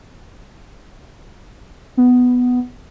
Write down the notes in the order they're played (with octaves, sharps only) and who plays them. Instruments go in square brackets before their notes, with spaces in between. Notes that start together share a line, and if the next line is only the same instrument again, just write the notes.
[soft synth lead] B3